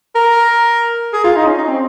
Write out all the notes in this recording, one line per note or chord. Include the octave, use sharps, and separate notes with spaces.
A#4
G#4
F4
D#4
C#4
D#4
C4